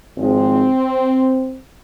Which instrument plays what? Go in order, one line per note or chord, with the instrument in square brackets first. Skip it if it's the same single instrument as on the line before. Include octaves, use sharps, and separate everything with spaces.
[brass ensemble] G#1 G#2 F3 G#3 C4